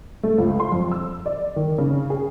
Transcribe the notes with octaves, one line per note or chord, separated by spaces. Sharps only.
A3
C#2
C6
F2
E6
D5
D#3
C#3
G#4